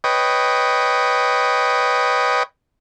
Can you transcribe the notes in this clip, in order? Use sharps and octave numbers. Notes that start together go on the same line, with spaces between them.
B4 C#5 D#5 G5